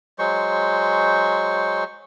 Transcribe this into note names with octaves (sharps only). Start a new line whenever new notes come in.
F#3 G#3 C5 C#6